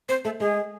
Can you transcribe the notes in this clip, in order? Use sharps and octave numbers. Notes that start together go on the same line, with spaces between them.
C4 C5
A3 A4
G#3 G#4